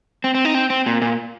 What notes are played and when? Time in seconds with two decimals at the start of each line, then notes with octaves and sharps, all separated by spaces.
0.24 C4
0.34 C4
0.45 D#4
0.55 C4
0.70 C4
0.86 A#2
1.02 A#2